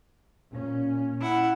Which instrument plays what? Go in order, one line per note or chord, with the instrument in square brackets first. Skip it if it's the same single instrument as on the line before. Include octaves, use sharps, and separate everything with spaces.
[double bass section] A#2 C#4
[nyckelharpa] E4 F#5